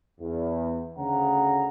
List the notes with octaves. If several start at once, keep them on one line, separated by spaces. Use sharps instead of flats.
E2
D2 C#3 F#5 A#5